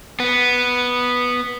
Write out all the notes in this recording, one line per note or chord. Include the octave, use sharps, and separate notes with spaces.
B3